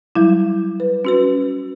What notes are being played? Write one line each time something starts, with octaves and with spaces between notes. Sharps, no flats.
F#3 G3 E4
B4
C#4 F#4 B4